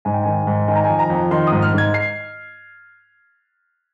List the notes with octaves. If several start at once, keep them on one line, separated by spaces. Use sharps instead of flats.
G#2 G#5
G5
D#3 G#5
G#2
D#3 G#5
A#5
G#5
F2
A#5
F2
D#3 C6
G#2 D#6
F6
G#2 G#6
C7